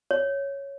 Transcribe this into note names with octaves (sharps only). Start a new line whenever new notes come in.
C#5